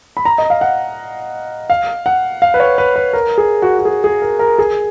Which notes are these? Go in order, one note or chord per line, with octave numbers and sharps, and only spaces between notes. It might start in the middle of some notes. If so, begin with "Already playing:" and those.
B5
A#5
D#5
F5
F#5
F5
F#5
F5
B4
C#5
B4
B4
A#4
G#4
F#4
F#4
G#4
G#4
A#4
A#4
G#4